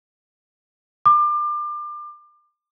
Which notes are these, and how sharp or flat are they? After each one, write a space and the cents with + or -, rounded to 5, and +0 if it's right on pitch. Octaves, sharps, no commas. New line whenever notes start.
D6 +30